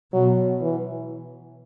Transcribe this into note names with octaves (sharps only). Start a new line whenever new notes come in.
B2 F#3
E3